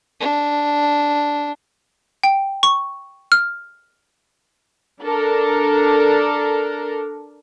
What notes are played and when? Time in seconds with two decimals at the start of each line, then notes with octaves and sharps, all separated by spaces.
0.20 D4
2.23 G5
2.63 C#6
3.32 F6
5.04 D4 A4 A#4